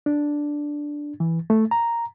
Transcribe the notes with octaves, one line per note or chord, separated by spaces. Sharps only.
D4
E3
A3
A#5